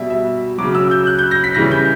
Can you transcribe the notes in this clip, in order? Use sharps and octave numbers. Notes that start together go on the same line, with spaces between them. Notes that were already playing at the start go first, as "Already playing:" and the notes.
Already playing: B2 G3 E5
E5
C#3 F#3 D6
E6
G6
F#6
G6
A#6
B6
C#3 E3 G3 A#6
G6